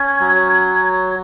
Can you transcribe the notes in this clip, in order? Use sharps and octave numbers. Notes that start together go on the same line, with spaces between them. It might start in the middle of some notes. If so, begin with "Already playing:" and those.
Already playing: C#4 G#6
F#3